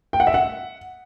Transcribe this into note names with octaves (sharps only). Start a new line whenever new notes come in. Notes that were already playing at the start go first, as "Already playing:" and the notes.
G5
F#5
E5
F#5